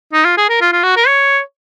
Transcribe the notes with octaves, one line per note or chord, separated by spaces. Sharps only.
D#4
F4
G#4
A#4
F4
F4
F#4
A#4
C#5